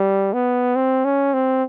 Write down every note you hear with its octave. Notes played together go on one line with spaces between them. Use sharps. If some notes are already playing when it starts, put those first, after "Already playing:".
Already playing: G3
B3
C4
C#4
C4